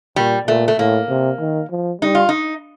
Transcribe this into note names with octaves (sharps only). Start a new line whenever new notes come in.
A#2 G3
A#2 A3
A3
A2 A#3
C3
D#3
F3
G3 D#4
F4
D#4